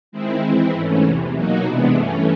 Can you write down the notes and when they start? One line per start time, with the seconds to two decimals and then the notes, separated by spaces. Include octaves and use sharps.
0.12 D#3 G#3 C4 E4
0.42 E3 G#3 C4 E4
0.72 G#2 E3 A3 C#4
1.02 E2 C3 E3
1.33 B2 F#3 A#3 D#4 F#4
1.63 C3 E3 G#3 B3 D4
1.93 G2 E3 A3 C#4